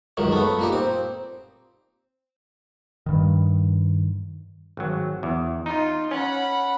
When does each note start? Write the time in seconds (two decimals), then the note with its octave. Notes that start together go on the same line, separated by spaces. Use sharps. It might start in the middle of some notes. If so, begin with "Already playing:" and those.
0.17 C#2 F#2 D#3
0.32 A3 B3
0.59 A#2 D#4 G4
0.72 C4
3.06 G2 D#3
4.77 G#1 F#3
5.23 E2
5.66 D#4 F4
6.11 C#4 F#5 B5